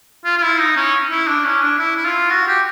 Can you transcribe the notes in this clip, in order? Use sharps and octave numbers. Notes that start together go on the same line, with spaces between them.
F4
F4
E4
D#4
C#4
E4
D4
C#4
D4
E4
E4
F4
F#4
G4